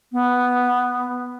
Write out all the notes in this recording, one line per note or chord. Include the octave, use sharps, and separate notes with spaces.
B3